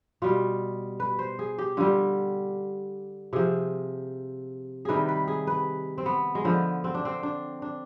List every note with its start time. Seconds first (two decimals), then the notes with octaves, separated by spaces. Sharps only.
0.22 B2 G3 F4
1.00 B4
1.19 C5
1.39 G#4
1.58 G4
1.77 D3 G3 F4
3.33 C3 F3 G#4
4.85 C3 D#3 G3 G#4 B4
5.08 B4
5.28 G#4
5.47 B4
5.98 C4
6.06 B3
6.35 G#3
6.45 D3 F3 B3
6.84 C4
6.95 D4
7.05 C4
7.23 D4
7.62 D4